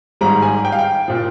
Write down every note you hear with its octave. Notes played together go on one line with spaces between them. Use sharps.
G#1 G#2 G3 A#5
G#5
G5
F5
G5
A#2 F3